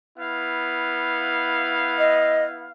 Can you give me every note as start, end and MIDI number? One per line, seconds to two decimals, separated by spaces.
0.18 2.69 59
0.18 2.69 64
0.18 2.69 77
1.99 2.44 75